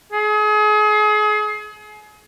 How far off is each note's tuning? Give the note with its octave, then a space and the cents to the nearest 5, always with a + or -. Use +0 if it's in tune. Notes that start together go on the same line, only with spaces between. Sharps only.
G#4 +35